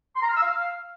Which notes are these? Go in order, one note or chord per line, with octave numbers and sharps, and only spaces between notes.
C6
A#5
F6
E6
F5